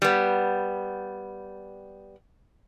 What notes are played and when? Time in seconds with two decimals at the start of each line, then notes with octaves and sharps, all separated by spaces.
0.02 G3 B3